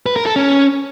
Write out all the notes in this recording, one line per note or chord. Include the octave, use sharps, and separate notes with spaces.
B4
A#4
A4
C#4